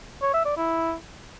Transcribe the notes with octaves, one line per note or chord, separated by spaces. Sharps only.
C#5
E5
D5
E4